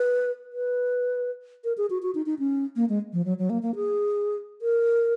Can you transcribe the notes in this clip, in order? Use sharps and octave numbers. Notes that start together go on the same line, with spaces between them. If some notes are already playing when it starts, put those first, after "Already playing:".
Already playing: B4
B4
A#4
G#4
F#4
F#4
D#4
D#4
C#4
A#3
G#3
F3
F#3
F#3
A#3
A#3
G#4
A#4